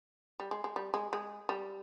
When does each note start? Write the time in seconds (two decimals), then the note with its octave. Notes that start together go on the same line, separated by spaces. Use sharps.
0.40 G3
0.51 G#3
0.64 G#3
0.76 G3
0.94 G#3
1.13 G#3
1.49 G3